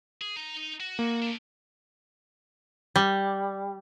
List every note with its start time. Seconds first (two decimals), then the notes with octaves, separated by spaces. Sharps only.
0.22 G#4
0.36 D#4 A#5
0.80 F#4
0.99 A#3
1.22 A3 D4
2.96 G3